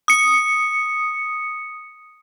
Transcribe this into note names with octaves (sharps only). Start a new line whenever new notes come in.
D#6 C#7